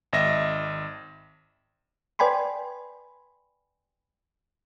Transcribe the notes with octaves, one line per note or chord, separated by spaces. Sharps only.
G#1 D#5 E5 A#6
B4 D5 G5 G#5 B5 C6